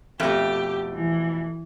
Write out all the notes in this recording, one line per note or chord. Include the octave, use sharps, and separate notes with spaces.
F2 B2 A3 G4
E3